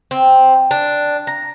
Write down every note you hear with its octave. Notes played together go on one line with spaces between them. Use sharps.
C4
D4
A#5